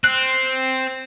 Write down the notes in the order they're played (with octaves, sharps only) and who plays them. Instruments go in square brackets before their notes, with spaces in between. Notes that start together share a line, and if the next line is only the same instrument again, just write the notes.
[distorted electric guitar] C4 [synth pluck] F#6